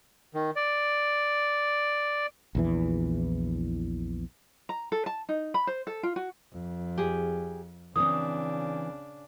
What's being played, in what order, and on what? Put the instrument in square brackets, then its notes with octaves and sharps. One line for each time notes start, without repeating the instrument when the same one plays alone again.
[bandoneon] D#3
D5
[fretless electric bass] A#1 E2 E3
[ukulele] A#5
A4
A5
D#4
B5
C5
A4
F4
F#4
[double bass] F2
[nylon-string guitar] G4 G#4
[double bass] C#3 D4 [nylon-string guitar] E3 C4 [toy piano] D#6